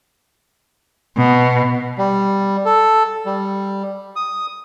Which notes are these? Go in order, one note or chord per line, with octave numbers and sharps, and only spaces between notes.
B2
G3
A4
G3
D#6